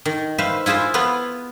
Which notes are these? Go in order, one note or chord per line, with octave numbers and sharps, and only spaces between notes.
D#3
B4 C5 E5 F5
E4 F4 G#4 C5 E5
B3 E4 F4 B4